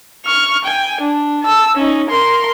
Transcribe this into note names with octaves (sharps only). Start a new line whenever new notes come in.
C#6 F6
G5 G#5
D4
A5 E6
C#4 D#4
A#4 C6